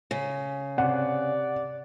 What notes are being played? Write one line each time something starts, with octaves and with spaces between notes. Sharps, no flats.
C#3
C3 D5 F#5